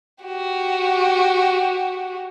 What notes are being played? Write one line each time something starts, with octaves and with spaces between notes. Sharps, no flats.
F#4 G4